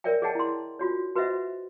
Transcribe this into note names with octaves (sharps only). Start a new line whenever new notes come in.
A#4 C#5 D5 E5 G5
G#4 C#5 D#5 F#5 G5 A5
E4 C6
F4 F#4 C#5
F#4 B4 C5 D#5 E5 F#5